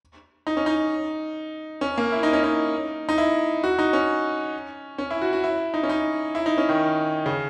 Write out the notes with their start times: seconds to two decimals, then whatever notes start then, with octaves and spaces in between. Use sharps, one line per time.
0.47 D#4
0.57 C#4
0.66 D#4
1.81 C#4
1.98 A#3
2.12 E4
2.23 D#4
2.33 C#4
2.43 D#4
3.09 D#4
3.18 E4
3.64 F#4
3.79 D#4
3.93 C#4
4.98 C#4
5.11 E4
5.22 F#4
5.33 F#4
5.44 E4
5.74 D#4
5.83 C#4
5.89 D#4
6.35 E4
6.46 D#4
6.58 C#4
6.69 D#3
7.26 C#3